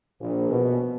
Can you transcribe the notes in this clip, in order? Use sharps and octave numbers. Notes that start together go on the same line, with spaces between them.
A#1
B2